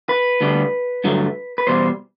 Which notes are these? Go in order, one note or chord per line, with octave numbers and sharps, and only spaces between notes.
B4
D2 D3 G3
G2 D3 F#3 A3
B4
E2 B2 G3 C5